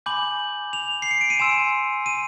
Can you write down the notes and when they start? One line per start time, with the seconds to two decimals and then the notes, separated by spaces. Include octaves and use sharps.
0.06 G#5 B5 D6 G6 F#7
0.73 F7
1.02 C7
1.11 C#7
1.21 D7
1.30 D#7
1.39 G#5 C6 E6 E7
2.06 D#7